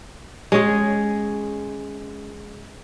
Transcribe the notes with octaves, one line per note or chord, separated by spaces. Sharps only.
G#3 C#4 G#4